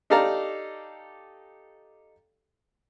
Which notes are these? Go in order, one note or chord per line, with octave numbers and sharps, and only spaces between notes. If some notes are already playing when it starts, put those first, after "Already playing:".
D#4 G4 A4 D5 F5 A#5